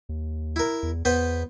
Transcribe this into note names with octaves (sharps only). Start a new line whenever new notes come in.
D#2
E4 A#4
E2
E2 B3 B4 C5